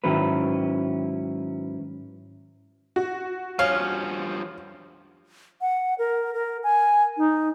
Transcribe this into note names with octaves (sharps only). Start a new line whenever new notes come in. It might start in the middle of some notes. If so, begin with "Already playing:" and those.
G#2 D#3 F#3 C#4 E4 B4
F#4
G2 F3 C#4 F5
F#5
A#4
A#4
G#5
D#4